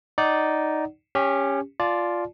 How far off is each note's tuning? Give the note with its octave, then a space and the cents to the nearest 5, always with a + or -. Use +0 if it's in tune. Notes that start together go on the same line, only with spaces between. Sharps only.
D#4 +0 D5 -5 F#5 +25
C#4 +0 G4 +25
F4 +0 D5 +0 A5 -40